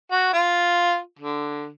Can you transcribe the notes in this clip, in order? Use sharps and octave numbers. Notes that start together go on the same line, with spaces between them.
F#4
F4
D3